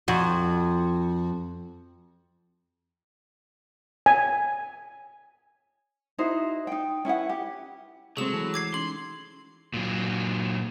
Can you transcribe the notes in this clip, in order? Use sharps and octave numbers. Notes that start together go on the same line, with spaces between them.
F2 F#4
G#5
D#4 E4 F#4 C5
D#4 G5
C#4 E4 B4 F#5
G4
C3 F#3 G#3 A3 C4 G#4 A4 E7
E3 A5 B5
C#6 D6 G#6 C7
C#4 D#4 C6 F#7
A#2 F#3